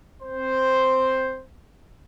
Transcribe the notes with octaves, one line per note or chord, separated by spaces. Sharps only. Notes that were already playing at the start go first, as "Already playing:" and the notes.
C4 C5